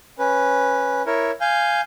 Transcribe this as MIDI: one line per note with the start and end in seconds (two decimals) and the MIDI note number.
0.19 1.02 61
0.19 1.02 71
1.06 1.31 64
1.06 1.31 70
1.06 1.31 73
1.41 1.81 77
1.41 1.81 80
1.41 1.81 91